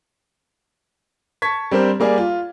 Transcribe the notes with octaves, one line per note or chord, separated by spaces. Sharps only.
A5 C#6 G#6 B6
G3 C4 D4 A#4 C5
G3 A#3 G#4 D5
F4